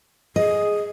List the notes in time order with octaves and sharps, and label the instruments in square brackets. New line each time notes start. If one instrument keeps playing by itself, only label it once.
[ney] G#4 [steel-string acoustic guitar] D#5